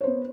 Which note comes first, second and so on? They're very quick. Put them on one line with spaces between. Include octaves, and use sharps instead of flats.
C#5 C5 B3